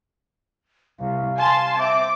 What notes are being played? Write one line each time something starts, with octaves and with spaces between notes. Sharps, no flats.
C2 F5
G#5 A5 C6
C4 E5 D6